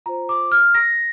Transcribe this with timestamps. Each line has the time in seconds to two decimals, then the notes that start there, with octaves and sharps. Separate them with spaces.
0.06 F4 C5 A#5
0.29 D6
0.52 F6
0.75 A#6